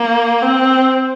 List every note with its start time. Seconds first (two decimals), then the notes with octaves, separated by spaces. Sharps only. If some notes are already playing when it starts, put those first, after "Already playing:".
Already playing: A#3
0.43 C4